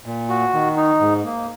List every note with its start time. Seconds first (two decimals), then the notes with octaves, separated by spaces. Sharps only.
0.06 A#2
0.29 F#4
0.54 D#3
0.76 D#4
1.00 G#2
1.25 A#3